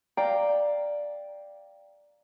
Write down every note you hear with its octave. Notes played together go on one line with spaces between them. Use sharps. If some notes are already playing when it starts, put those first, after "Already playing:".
D5 F5 G5 A#5